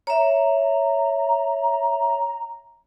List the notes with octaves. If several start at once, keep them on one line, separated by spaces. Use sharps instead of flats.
C#5 E5 A#5